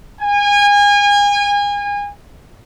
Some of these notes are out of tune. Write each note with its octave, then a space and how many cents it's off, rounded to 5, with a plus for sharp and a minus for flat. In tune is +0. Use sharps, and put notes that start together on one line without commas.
G#5 -30